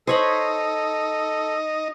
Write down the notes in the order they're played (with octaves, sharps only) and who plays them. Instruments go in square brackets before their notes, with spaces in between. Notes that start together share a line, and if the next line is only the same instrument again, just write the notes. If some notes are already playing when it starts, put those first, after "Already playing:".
[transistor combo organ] D#4 D#5 [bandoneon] A4 [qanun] C5 C#5 B5